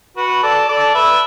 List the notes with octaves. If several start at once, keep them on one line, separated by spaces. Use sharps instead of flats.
F#4 B4
A4 D5
A4 D5
B4 E5